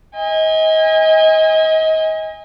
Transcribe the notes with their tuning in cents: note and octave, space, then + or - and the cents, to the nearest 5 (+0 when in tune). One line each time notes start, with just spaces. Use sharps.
D#5 +30 G#5 -25